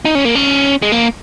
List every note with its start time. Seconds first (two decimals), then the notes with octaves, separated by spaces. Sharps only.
0.05 D#4
0.15 C#4
0.25 A#3
0.35 C#4
0.82 G#3
0.92 A#3